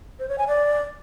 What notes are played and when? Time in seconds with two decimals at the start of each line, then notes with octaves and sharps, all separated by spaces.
0.20 C5
0.29 C#5
0.38 G#5
0.48 D5